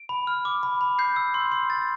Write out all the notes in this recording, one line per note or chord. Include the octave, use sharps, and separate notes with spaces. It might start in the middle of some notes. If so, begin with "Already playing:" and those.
Already playing: D7
B5
F6
D6
B5
B5
G6 C7
E6
C6
C6
G6 A6